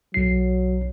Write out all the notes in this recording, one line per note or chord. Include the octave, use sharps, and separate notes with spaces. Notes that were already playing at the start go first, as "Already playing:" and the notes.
B1 F#3 C7